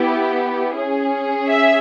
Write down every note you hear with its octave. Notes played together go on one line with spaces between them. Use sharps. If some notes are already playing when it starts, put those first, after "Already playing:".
Already playing: B3 E4 G4
C#4 G#4
E5